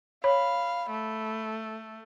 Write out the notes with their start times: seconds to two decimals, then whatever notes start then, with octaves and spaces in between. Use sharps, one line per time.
0.24 C#5 F5 B5
0.90 A3